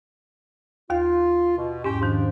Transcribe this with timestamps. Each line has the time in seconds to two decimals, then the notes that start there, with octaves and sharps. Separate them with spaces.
0.90 D#2 F4 F5
1.57 B2
1.84 E2 G#2 C#4 G4
2.02 G#2 D#3 F3 D4